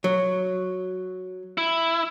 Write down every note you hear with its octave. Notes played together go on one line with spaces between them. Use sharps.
F#3
E4